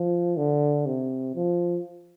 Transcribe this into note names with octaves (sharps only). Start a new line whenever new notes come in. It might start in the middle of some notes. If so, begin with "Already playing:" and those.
Already playing: F3
D3
C3
F3